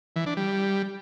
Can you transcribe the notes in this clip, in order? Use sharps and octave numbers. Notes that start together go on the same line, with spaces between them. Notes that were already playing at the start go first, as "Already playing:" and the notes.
E3
D4
G3